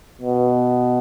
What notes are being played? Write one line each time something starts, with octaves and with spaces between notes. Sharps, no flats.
B2